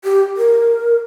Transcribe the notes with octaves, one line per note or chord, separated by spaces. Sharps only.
G4
A#4